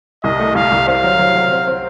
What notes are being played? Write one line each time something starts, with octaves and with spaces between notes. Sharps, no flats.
C2 D#5
A3
C2 F5
C2
C4 F5
F#3
F#3
F#3
C4
C4